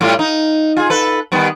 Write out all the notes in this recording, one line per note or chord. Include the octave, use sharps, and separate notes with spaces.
A2 G3 F4
D#4
F4 G#4
A4 B4
D#3 G3 B3